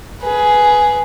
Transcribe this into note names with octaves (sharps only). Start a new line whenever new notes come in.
G#4 B4